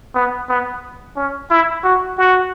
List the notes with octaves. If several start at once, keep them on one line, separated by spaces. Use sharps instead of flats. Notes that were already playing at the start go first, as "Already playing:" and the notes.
B3
B3
C#4
E4
F#4
F#4